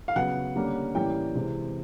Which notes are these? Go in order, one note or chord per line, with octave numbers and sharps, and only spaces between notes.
F5
C#3 F#3 B3 F#5
D3 G3 A#3 C#4
A2 E3 G3 A#3 C#4 G5
C3 E3 G#3 C4